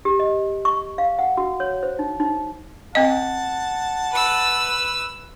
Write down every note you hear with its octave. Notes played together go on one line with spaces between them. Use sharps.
G4
D#5
C#6
F5
F#5
F#4
C#5
C5
D#4
D#4
C4 D#5 F#5 A5
B4 E6